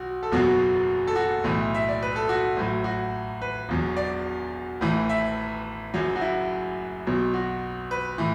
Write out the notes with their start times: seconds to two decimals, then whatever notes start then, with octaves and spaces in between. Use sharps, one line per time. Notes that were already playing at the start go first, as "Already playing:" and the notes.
Already playing: B1 F#4
0.23 A4
0.32 F#1 E2 B2 F#3 F#4
1.07 A4
1.16 F#4
1.44 B1 A2 E3
1.74 E5
1.88 D5
2.02 B4
2.16 A4
2.29 F#4
2.56 A1 A2 F#3
2.84 F#4
3.42 B4
3.69 E1 E2 B2 F#3
3.97 D5
4.81 A1 A2 E3
5.09 E5
5.94 F#1 F#2 F#3
6.16 F#4
6.21 E4
7.07 B1 B2 F#3
7.34 F#4
7.91 B4
8.18 A2 E3